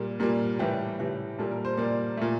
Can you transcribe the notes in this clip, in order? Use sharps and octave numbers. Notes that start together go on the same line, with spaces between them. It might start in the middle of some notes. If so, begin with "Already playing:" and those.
Already playing: A#2 G3 A#3
A#2 G3 A#3
A2 E3 G3 G4
A2 E3 G3
A#2 G3 A#3 A4
A#4
C5
A#2 G3 A#3 D5
A#2 A3